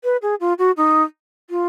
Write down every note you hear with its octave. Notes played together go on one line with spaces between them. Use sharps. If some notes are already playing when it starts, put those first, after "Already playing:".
B4
G#4
F4
F#4
D#4
F4